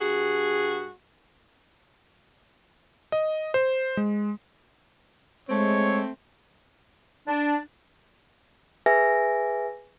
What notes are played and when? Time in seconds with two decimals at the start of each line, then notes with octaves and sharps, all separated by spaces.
0.01 G2 F#4 G#4
3.12 D#5
3.54 C5
3.97 G#3
5.49 G#3 A3 C4 C#5
7.27 D4
8.86 G#4 B4 E5 G#5 A#6